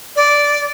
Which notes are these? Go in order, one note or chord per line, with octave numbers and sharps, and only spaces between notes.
D5